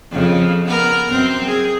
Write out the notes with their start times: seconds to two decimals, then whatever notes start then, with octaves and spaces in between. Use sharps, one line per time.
0.12 F2 C#3 F3
0.65 B3 A#4
1.10 F#2 C4
1.47 G#4